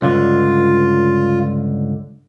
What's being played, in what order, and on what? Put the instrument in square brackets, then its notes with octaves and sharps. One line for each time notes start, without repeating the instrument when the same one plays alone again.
[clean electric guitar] C#2 G2 D3 [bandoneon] F4